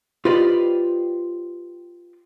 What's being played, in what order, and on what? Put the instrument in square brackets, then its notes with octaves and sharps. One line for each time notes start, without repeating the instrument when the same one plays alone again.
[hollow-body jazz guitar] F4 G4 B4 C5 D5 D#5